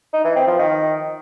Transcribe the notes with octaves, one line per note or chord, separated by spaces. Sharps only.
D#4
E3
C4
F3
D#3